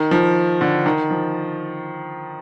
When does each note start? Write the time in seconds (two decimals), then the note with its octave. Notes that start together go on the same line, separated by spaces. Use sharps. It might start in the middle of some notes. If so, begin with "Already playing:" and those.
Already playing: D#3
0.11 F3
0.61 D3
0.86 D#3
1.10 F3